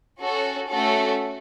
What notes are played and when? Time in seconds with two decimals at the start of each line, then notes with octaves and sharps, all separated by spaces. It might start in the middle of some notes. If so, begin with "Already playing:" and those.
0.20 C#4 F#4 A4
0.70 A3 C#4 F#4 A4